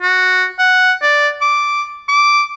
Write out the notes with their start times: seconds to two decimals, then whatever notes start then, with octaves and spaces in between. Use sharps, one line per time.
0.02 F#4
0.59 F#5
1.02 D5
1.41 D6
2.09 D6